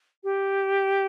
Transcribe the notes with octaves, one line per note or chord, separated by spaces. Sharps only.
G4